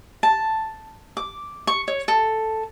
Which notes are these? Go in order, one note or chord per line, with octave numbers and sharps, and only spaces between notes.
A5
D6
C#6
C#5
A4